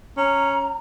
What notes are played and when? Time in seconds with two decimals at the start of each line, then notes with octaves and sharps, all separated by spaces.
0.17 C#4 A#5